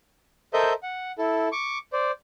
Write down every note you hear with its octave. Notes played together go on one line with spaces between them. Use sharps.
A4 A#4 C5 D#5 E5 G6
F#5
E4 A4
C#6 D6
C5 D5